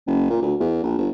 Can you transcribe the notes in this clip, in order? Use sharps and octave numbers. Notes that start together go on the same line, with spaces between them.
F#1
A#2
D2
E2
A#1
G1